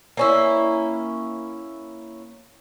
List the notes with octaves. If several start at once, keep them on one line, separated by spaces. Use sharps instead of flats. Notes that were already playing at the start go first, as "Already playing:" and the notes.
A#3 C#4 E4